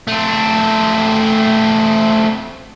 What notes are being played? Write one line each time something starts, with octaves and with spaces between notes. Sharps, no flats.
A3 C4